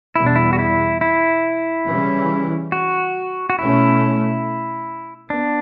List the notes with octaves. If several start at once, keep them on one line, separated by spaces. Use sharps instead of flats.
E2 B2 G3 B3 E4
D4
E4
F#4
E4
E4
C#3 E3 G3 C#4
F#4
F#4
B2 A3 C#4 E4
B3 D4